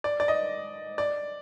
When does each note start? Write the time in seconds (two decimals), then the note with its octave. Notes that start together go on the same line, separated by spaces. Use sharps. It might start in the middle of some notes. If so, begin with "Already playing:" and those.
0.04 D5
0.20 D5
0.28 D#5
0.98 D5